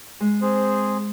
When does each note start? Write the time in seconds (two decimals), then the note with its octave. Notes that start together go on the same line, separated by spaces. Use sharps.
0.20 G#3
0.41 C4 G#4 C5